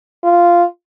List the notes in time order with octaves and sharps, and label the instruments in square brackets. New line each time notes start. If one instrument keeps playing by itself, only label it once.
[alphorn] F4